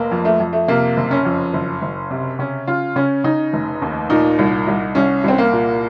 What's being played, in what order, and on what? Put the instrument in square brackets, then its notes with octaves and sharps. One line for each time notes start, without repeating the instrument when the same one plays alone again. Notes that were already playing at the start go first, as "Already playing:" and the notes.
Already playing: [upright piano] F1 A#3
F2
A3
F2
A3
C3 A#3
F#1
C#4
F2
F#1
F#1
C3
C#3 C#4
C#3 F4
C#3 C#4
C#3 D#4
F1
D#2
A#2 D#4
C2
C2
C2 C#4
C2 C4
A#3
A#2